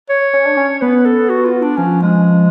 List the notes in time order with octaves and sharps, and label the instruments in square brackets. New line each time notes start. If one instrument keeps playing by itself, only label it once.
[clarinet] C#5
[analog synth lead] C#4
D4
C#4
[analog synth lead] B3 [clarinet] B4
[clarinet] A4
F#4
F4
D4
[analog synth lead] F3 [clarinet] C#4
[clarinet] G#3